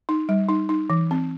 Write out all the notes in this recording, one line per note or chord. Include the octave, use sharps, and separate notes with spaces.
D#4
G3
D#4
D#4
E3
C4